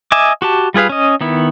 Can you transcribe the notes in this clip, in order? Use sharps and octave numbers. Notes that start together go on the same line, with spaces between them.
D#5 E5 G#5 D6
F#4 G4 A5
G3 F4 G#4 B4 F5
C#4 D#5
D#3 B3 E4